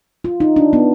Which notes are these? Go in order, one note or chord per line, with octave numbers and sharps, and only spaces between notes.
F4
D#4
D4
B3